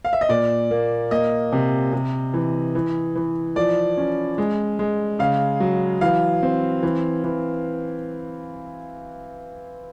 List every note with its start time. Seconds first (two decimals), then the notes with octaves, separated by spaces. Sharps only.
0.05 F5
0.13 E5
0.21 D#5
0.29 A#2 D5
0.71 A#3
1.11 A#3 D#5
1.52 C3
1.93 C3
2.34 E3
2.75 E3
3.15 E3
3.56 F3 D5
3.98 C#4
4.38 G#3
4.79 G#3
5.19 C#3 F5
5.60 F#3
6.01 E3 F5
6.43 C4
6.83 E3
7.24 E3